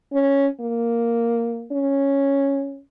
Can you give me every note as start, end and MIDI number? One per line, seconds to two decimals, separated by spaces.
0.13 0.48 61
0.61 1.67 58
1.72 2.81 61